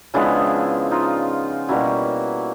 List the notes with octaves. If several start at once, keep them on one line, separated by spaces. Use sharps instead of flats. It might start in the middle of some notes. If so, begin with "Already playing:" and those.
C#3 F3 G#3 B3 D4 E4
D#4 F4
B2 G3 A#3 C#4 E4 F#4